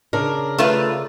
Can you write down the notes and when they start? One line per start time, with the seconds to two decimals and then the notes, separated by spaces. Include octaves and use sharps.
0.13 C#3 D4 A#4
0.58 A3 F4 B4